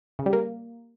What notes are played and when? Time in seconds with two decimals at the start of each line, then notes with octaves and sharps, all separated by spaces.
0.19 C#3
0.26 G3
0.33 A#3